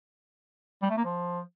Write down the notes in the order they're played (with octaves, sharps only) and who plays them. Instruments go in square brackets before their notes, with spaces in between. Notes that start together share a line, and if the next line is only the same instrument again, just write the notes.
[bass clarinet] G3
A3
A#3
F3